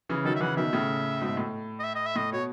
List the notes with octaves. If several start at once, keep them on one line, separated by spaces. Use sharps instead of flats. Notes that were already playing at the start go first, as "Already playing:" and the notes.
C#3 E3
D#3 F#3 A4
E5
C#3 E3 F#5
B2 D#3 E5
A2 C#3
G#2 B2
A2
D#5
E5
D#5
E5
A2 D#5
B2 C#5